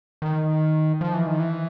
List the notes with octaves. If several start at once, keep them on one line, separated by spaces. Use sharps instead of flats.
D#3
F3
E3
D#3
E3